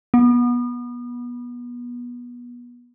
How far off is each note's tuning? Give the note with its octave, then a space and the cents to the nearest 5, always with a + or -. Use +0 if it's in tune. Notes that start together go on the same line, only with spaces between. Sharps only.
B3 -25